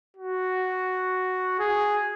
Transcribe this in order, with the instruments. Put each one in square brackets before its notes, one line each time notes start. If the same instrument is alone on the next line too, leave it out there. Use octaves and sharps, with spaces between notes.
[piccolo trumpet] F#4
G#4